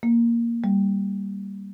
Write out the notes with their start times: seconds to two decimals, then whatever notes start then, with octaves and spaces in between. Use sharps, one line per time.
0.03 A#3
0.64 G3